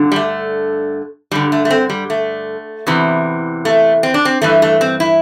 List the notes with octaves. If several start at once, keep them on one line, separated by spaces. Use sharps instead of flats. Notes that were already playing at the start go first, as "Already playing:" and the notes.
Already playing: G2 D3
G3
A3
G2 D3 G3
A3
A3
C4
G3
A3
E2 C3 E3
A3
C4
D4
C4
G2 E3 A3
A3
C4
E4